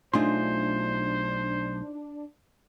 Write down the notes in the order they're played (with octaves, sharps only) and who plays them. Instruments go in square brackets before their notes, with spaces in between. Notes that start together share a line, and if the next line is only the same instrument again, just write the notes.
[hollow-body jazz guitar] B1 A3 C6 [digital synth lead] D4 [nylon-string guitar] D#4 F4 G#4 [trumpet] C5